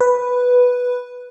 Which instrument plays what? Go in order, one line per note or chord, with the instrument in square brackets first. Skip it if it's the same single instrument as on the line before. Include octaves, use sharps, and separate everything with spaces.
[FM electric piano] B4